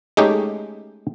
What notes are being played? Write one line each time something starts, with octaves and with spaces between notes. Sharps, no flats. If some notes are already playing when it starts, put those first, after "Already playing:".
G#3 A3 C#4 D#4 G4